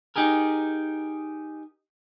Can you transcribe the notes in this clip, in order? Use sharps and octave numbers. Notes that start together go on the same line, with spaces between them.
D#4 G4 G#4 A#4